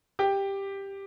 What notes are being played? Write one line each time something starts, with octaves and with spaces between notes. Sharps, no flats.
G4 G5